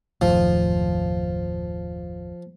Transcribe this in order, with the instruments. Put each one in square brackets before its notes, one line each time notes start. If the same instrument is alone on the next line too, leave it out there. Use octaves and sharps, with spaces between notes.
[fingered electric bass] F#1 D#2 A2 [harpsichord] F3